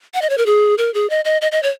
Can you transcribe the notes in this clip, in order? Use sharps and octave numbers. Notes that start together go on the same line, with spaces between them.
F#5
D#5
C#5
A#4
G#4
A#4
G#4
D#5
D#5
D#5
D#5
C#5